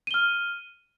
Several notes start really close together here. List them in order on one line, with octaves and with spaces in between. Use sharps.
D#7 G7 F6